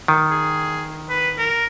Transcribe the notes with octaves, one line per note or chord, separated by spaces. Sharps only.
D#3
G#4
B4
A#4